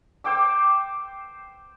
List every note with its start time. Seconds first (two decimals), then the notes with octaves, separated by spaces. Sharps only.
0.24 C5 G5 D6 E6